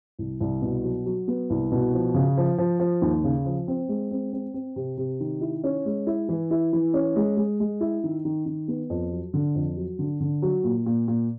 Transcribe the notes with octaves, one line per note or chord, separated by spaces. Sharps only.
C2
C2
B2
F#3
F#3
B3
C2
B2
F3
C#3
F3
F3
F3
D#2
C#3
F3
C4
G#3
C4
C4
C4
C3
C3
D#3
E4
C#4
G#3
E4
E3
E4
E3
C#4
G#3
G#3
G#3
E4
D#3
D#3
D#3
B3
F2
F#3
D3
F2
F#3
D3
D3
F#3
A#2
A#2
A#2